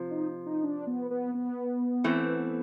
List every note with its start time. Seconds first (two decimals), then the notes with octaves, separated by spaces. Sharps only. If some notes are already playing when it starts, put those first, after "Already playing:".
Already playing: C3 F3
0.11 D#4
0.46 D#4
0.63 D4
0.87 B3
1.11 B3
1.34 B3
2.04 E3 A3 C4